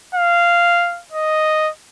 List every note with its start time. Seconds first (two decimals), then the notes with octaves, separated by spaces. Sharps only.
0.15 F5
1.12 D#5